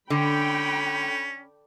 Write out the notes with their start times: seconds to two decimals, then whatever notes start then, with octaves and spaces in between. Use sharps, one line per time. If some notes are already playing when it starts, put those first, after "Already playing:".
0.10 D3 C#4 G5 B5